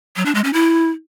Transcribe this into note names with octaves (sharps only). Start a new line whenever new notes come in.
F#3
D4
G#3
C#4
E4